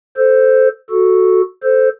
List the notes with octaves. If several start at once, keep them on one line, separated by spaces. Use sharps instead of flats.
A4 C5
F#4 A4
A4 C5